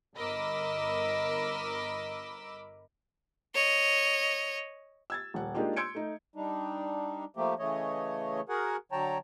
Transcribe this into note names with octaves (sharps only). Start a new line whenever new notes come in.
G1 A#4 D#5 B5 D6 E6
C#5 D#5
E6 G#6 A6
D#1 F#5
G#3 A#3 D4 D#4 F4 G4
C6 E6 G6 G#6 C#7 D7
A3 D#4
G3 D4 D#4
F3 A3 A#3 G4
C#3 E3 A3 C#5 D#5
F#4 G#4 A#4 F#5 G#5
D3 F#3 C#5 G5 A5 A#5